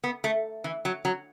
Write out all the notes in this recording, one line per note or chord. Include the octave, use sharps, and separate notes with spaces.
B3
A3
E3
F#3
F#3